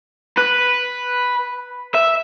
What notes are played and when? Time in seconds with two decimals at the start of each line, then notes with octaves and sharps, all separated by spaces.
0.38 B4
1.95 E5